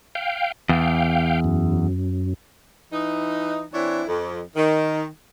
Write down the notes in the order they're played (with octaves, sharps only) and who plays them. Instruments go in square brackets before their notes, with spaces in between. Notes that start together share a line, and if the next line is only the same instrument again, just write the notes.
[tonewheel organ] F5 G5
[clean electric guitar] E2 [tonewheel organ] F5 G5
[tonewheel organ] F#2
[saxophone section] E3 D#4
E3 C4 D4 E4 C#5
F2
D#3